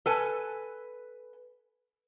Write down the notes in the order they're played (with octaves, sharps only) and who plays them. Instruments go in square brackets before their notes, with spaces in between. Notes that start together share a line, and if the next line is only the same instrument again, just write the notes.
[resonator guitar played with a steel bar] A4 B4 G#5